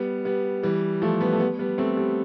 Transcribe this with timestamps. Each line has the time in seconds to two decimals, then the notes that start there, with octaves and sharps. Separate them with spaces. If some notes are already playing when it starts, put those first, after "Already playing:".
Already playing: G3 B3
0.25 G3 B3
0.63 E3 G3
1.02 F3 A3
1.21 G3 B3
1.33 A3
1.40 G3 B3
1.59 G3 B3
1.78 A3 C4
1.97 G3 B3